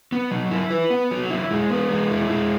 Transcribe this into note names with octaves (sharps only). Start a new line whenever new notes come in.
B3
F#3
E4
B4
B3
F#3
E4
G#3
B3
G#3
E4
G#3